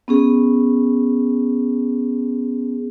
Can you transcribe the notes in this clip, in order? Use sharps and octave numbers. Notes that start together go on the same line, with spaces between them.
B3 C#4 G#4